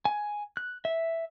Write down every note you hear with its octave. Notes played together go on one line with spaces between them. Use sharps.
G#5
F#6
E5